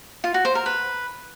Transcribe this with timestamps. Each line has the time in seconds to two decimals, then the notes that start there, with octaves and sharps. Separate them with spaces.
0.24 F4
0.34 F#4
0.45 C5
0.55 A#4
0.66 B4